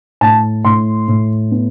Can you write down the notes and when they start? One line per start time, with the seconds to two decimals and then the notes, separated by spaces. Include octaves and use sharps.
0.21 A2 A5
0.65 A2 C6
1.08 A2
1.52 B3